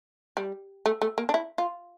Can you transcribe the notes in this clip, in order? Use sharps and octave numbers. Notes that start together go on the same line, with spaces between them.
G3
A3
A3
A#3
D4
E4
F4